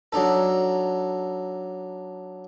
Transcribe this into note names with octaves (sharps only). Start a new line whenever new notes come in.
F#3 D4 D#4 A4